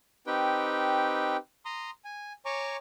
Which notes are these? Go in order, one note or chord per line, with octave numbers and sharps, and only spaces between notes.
C4 D#4 G4 B4 G5
A#5 C6 D#6
G#5
C#5 G#5 A#5 C#6 D6